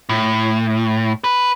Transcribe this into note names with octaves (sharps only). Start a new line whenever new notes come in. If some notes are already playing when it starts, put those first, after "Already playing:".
A2
B4